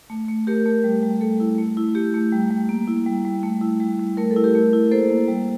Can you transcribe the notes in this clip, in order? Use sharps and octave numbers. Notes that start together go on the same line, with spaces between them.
A3
A3
A3 G4 A#4
A3
G3
G3
A3 A4
E4
A3
E4
A3 G4
A3
G3
G3
A#3
E4
G3
G3
A3
E4
G3
G3
A3 A#4
A4
E4
G4 A#4
A3
E4
A#3 A4 C5
A#3
G3